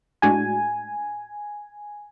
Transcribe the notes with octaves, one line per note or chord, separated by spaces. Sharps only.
A2 G#3 D4 F#4 G#5